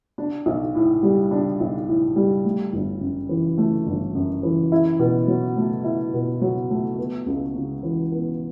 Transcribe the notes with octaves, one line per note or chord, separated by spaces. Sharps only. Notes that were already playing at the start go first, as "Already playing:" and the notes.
D4
B1
A2
G3
D4
B1
A2
G3
A3
G1
F#2
E3
A3
G1
F#2
E3
E4
B2
F#3
A3
E4
B2
F#3
A3
B3
C#2
C#3
E3
B3